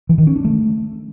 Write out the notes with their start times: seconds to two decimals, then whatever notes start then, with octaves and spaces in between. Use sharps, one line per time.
0.09 E3
0.18 D#3
0.27 C#4
0.36 D4
0.45 A3